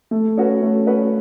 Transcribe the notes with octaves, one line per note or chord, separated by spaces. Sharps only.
A3
C#4 F#4 B4
A3
C#4 F#4 B4